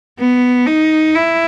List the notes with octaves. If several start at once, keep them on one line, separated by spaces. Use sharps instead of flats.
B3
D#4
E4